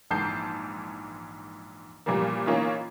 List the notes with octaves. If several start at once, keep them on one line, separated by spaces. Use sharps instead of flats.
A#1 G#2 E3 A5 G6 C7
G2 A#2 E3 F3 G3 A#3
E3 A#3 C#4 D#4 F4